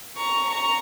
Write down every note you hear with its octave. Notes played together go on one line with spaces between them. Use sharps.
A#5 C#6
A#5 C#6